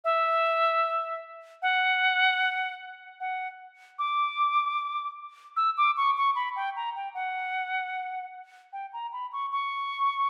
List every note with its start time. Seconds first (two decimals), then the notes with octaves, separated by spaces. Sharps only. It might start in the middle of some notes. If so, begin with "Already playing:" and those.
0.04 E5
1.62 F#5
3.20 F#5
3.99 D6
5.57 E6
5.77 D6
5.97 C#6
6.17 C#6
6.35 B5
6.56 G5
6.76 A#5
6.96 G5
7.14 F#5
8.73 G5
8.93 A#5
9.13 B5
9.33 C#6
9.52 C#6